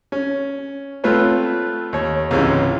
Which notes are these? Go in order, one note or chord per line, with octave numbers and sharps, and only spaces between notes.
C#4
A3 C4 F4 B4 C#5
D#2 C#5
C#2 G#2 C3 E3 G#3 C#4